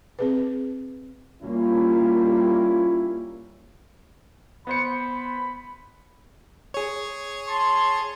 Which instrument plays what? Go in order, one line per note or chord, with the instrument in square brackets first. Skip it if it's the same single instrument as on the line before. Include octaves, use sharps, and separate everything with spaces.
[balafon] C4 G#4 B4
[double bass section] G3 A#3 [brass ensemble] C#4 E4 F4
[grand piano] B3 C5 C#7 [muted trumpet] B5
[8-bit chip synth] G#4 C#5
[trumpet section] A5 C6